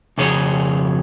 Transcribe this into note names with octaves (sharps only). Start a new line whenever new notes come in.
F2 C#3 G#4 C#5